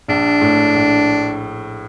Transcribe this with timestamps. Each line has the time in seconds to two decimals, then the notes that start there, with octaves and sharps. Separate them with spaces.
0.08 A#1 D4
0.41 A2
0.74 A#1